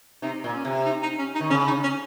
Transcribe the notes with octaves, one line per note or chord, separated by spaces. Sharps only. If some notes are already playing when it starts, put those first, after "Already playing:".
C3 D#4
A#2
C#4
C3
D#4
D#4
C#4
D#4
D#3
C#3 C#4
D#4
C#4